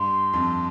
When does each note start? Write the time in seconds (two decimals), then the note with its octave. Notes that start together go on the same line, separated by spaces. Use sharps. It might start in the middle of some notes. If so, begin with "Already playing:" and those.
Already playing: G2 C6
0.33 F2